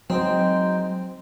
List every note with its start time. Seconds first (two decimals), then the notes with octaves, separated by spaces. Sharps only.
0.10 F#3 G#3 C4 D#4 G5